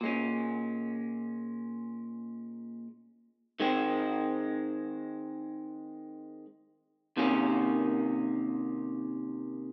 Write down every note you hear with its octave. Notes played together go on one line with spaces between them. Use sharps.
A#2 G#3 C#4
D#3 G#3 C4
C3 D#3 A#3 C#4